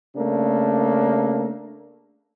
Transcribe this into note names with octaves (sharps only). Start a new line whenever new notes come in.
C#3 A3 A#3 D4